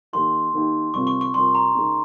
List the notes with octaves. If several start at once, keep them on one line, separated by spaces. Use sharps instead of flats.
D#3 A#3 D#4 G4 C6
D#3 A#3 D#4 G4
C3 G3 C4 F4 A#4 C#6
C#6
C#6
C3 G3 C4 F4 A#4 C6
A#5
C#3 G#3 D#4 A#4